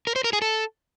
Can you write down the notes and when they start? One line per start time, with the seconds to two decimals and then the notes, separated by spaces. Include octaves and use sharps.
0.07 A#4
0.16 C5
0.24 A#4
0.33 G#4
0.42 A4